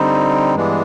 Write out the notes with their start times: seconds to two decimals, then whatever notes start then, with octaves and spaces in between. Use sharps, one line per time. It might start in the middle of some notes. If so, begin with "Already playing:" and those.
Already playing: D3 G3 C4 D#4
0.55 G2 E3 G#3 B3 D4